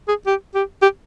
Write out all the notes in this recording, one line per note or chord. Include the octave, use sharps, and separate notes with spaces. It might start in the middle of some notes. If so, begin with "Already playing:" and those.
G#4
G4
G4
G4